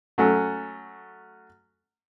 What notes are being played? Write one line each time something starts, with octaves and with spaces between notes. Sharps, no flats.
F#3 A3 C#4